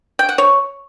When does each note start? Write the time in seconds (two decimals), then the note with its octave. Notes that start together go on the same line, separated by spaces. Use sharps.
0.19 G5
0.29 F#5
0.38 C#5